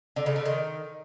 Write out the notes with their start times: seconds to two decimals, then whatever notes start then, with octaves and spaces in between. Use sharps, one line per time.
0.16 D3
0.26 C#3
0.36 D3
0.46 D#3